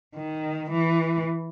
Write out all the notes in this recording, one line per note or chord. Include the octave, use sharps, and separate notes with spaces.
D#3
E3